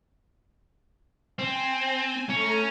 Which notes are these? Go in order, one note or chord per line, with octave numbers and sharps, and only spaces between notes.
C4 G#5
A3 C#4 A#5